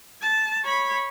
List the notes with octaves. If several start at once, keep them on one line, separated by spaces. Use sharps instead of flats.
A5
C#5 B5